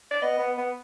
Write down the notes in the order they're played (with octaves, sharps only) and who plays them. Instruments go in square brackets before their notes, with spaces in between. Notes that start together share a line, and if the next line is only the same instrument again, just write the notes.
[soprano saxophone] D5
[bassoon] B3 [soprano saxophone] D#5
[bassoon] B3
B3